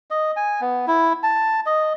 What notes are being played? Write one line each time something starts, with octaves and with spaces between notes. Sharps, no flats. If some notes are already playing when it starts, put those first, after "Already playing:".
D#5
G#5
B3
E4
A5
D#5